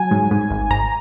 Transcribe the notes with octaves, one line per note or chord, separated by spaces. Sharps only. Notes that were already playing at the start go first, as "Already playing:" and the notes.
Already playing: F#3 G#5
G#2
G#2
G#1
G#1 A#5